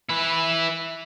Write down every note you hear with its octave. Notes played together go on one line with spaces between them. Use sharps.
E4 B4